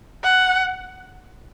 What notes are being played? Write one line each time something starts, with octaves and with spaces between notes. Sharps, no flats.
F#5